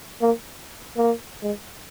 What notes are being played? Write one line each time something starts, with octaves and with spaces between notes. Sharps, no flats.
A#3
A#3
G#3